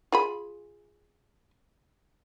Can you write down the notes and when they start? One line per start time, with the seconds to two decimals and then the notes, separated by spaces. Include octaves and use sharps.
0.12 F4 G#4 B5